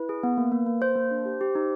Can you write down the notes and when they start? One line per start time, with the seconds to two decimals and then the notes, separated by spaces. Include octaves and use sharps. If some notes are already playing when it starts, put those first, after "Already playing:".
Already playing: E4 B4
0.09 G#4
0.23 B3
0.37 A#3
0.52 A#3
0.66 A#3
0.81 A#3 C5
0.96 A#3
1.11 D4
1.25 G4
1.41 G4
1.55 D#4